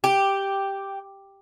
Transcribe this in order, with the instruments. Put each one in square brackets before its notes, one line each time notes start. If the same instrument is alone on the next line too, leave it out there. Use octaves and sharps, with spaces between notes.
[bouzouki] G4